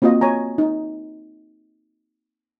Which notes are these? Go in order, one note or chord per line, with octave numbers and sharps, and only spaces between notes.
A#3 C4 F4 F#4 D#5
C#5 G#5 A#5
D#4